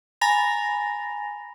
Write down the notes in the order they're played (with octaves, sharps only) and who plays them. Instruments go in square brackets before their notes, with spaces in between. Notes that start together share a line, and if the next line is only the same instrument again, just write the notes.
[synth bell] G#5 A#5 B5 A6 A#6 F7